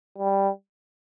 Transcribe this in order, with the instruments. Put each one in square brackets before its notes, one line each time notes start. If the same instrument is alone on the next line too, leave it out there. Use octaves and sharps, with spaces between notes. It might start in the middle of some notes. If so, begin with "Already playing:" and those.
[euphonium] G3